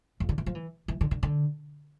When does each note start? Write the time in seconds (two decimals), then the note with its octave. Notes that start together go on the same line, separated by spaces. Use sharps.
0.20 F2
0.29 D3
0.38 E3
0.46 F3
0.55 E3
0.88 E3
1.01 D3
1.11 D3
1.23 D3